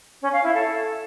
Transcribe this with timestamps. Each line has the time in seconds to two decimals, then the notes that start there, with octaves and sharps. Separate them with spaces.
0.22 C#4
0.32 F5
0.43 E4
0.54 A4